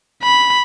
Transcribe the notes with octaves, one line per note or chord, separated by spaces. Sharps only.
B5